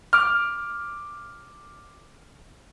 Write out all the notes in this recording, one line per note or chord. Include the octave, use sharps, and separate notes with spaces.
D6 F6